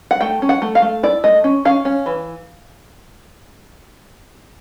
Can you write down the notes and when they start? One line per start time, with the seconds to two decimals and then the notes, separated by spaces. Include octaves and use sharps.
0.11 F#5
0.21 A3 G5
0.42 C#4
0.49 F#5
0.62 A3
0.75 F5
0.82 A3
1.03 E4 D5
1.24 A3 D#5
1.44 C#4
1.65 C#4 F5
1.85 C#4
2.06 E3